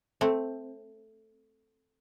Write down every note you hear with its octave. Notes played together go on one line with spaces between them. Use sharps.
A3 C4